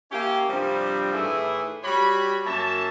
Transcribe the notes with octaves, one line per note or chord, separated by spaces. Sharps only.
A#3 C#4 E4 G4
G2 C3 F3 G3
A2 D#3 E3 A3 E4 G#4
G3 F#4 G4 C#5 B5
F#2 A#3 C#5 E5 A5